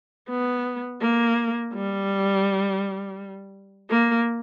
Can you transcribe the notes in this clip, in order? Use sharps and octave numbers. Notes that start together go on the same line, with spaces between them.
B3
A#3
G3
A#3